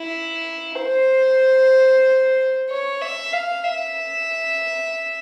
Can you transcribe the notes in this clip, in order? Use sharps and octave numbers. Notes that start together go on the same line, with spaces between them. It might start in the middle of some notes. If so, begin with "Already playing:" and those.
Already playing: E4
C5
C#5
E5
F5
E5